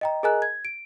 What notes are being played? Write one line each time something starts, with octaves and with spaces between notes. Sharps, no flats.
D#5 G5 A#5
G#4 A#4 D#5 G#5 A#5 F#6
G#6
D7